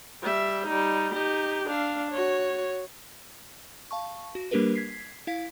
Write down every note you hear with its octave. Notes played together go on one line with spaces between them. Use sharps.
G3 E5
G3 D#4
D#4 G4
D4 F5
F#4 C#5
F5 A5 C#6
F#4
G3 A#3 D4 G4 A#4 B4
G#6 B6 C7
E4 F5 B6